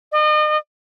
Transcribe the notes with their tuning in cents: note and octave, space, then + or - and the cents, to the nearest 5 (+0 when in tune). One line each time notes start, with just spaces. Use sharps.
D#5 -40